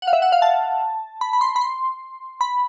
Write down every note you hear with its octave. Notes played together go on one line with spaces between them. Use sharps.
F#5
F5
E5
F#5
F5
A5
B5
B5
C6
B5
C6
B5